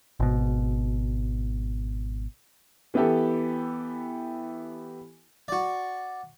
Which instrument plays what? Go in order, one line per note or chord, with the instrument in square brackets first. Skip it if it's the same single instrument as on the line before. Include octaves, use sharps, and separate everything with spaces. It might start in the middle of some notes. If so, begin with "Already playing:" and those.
[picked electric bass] G#1 B2
[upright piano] E3 B3 E4 G4 A4
[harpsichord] F#4 D5